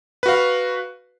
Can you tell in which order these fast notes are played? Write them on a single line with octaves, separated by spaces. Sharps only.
B4 F#4 F5